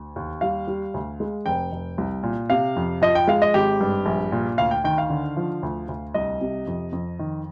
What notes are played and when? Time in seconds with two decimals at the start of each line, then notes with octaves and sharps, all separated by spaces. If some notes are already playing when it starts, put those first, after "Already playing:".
Already playing: D2
0.16 D#2
0.41 G3 F5
0.68 G3
0.94 D2
1.20 G#3
1.46 F1 G5
1.72 F1
1.98 C2
2.23 A#2
2.50 C3 F5
2.76 F2
3.02 F3 D#5
3.15 G5
3.27 G#3 F5
3.42 D#5
3.54 G#1 G4
3.81 G2
4.06 A#1
4.32 A#2
4.58 D2 F5
4.71 G5
4.84 D#3 G5
4.98 F5
5.10 D3
5.37 F3
5.63 D2
5.88 D2
6.14 C2 D#5
6.41 C3
6.67 F2
6.92 F2
7.19 D#3